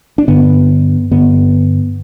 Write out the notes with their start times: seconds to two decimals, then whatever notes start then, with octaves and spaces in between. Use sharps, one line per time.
0.18 D4
0.28 G2 D3 B3
1.11 G2 D3 B3